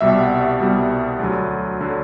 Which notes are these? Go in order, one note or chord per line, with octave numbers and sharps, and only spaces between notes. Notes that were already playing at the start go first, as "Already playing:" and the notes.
C2 B2 G3 E5
F#5
E5
C2 B2 G3
D2 D3 F#3
D3 F#3